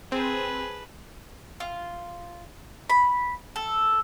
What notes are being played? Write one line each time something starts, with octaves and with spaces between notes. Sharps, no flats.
C4 G#4 B4 A5
F4
B5
A4